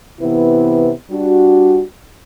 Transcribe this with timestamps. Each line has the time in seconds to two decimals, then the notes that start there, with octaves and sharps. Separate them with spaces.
0.21 C3 E3 B3 E4 B4
1.10 G3 D4 F#4